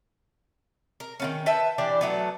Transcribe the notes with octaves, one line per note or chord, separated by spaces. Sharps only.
A#4
D#3 B3 C#4
B4 E5 G5 A5
E3 D4 G4 D5
F#3 A3 B3